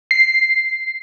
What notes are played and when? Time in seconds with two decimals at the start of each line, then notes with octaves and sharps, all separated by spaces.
0.11 C7